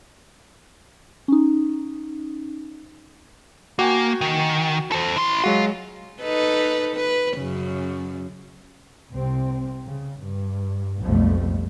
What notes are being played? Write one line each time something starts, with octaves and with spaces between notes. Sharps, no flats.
C#4 D#4
A#3 F#4 G5 G#5
D#3
A4 C5
E4 C6
F#3 G#3 F4 F#4
D#4 A4 B4
B4
F#2 C#3
C2 C3 C4
C#3
G2
B1 F2 G#2 B2 G3 A3